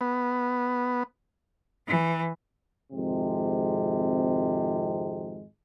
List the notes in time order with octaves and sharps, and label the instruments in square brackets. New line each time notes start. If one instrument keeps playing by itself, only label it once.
[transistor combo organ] B3
[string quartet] E3
[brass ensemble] G#1 F2 C3 G#3